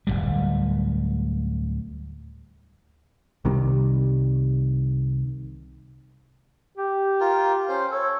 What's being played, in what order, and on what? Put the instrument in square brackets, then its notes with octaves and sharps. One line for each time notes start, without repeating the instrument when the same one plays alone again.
[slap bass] D1 C#2 G3
[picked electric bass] C2 C3 D#3 G3
[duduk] G4
[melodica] F4 A#4
C#4 C5
[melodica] A4 [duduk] C#5